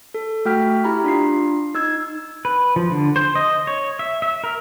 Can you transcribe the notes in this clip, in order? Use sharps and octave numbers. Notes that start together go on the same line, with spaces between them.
A4
A3 F#4 G5 F6 B6
E4 G4 A#5 B5
D4 F4 C7
D#4 E6 G#6
B4
F3
D3
C5
D#5
C#5
E5
E5
A#4